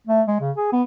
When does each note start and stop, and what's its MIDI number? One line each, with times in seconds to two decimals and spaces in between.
0.07 0.22 57
0.28 0.37 56
0.41 0.51 49
0.57 0.71 68
0.72 0.83 59